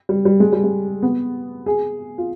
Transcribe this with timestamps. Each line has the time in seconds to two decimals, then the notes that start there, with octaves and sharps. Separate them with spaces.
0.09 G3
0.25 G3
0.40 G#3
0.52 G3
0.64 G#3
1.02 B3
1.66 G#4
2.18 F4